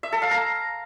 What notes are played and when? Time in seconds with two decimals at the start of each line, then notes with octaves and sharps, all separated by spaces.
0.03 E5
0.12 A4
0.22 F5
0.31 A#5